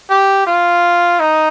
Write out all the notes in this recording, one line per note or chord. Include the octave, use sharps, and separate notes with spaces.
G4
F4
D#4